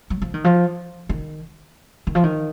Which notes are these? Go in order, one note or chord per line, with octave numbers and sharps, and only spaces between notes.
F#3
F3
D#3
F3
D#3
D#3
F3
D#3